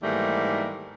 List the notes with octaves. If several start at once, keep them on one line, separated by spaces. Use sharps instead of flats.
G#2 D#3 E3 G3 A3 A#3